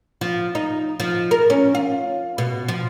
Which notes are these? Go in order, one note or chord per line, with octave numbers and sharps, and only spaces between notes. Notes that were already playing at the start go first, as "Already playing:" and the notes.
F3
D#4
F3
A#4
C#4
F4
B2
F3